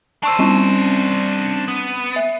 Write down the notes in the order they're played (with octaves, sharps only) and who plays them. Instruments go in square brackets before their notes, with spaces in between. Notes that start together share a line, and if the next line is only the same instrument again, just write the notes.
[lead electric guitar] D4 C5 [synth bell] A5 C#6 E6
[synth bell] G3 C4 C#4
[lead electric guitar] B3
[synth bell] E5